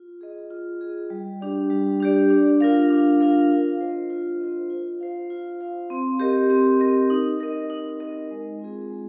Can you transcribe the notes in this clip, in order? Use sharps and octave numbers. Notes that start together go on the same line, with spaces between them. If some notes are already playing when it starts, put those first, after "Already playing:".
Already playing: F4
G#4 D#5
F4
G#4 D#5
G3
D4 G4 D5
G3
D4 G4 D5
D4
F4 A#4 F5
D4
F4 A#4 F5
F4
C5 D#5
F4
C5 D#5
F4
C5 F5
F4
C5 F5
C4
G4 A#4 D#5
C4
G4 A#4 D#5
D#4
A#4 D#5
D#4
A#4 D#5
G#3
C4 F4 G#4
G#3